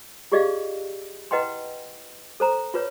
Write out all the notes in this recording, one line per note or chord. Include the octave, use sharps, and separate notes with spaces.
F4 G4 G#4 D5 D#5 F5
E4 B4 D#5 F#5 G5 C6
A4 C5 A#5
F4 B4 C#5